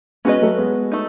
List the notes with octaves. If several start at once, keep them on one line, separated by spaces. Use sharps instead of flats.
G#3 B3 C#4 F#4 B4 D#5
F#3 A3
G#3 B3
A3 D#4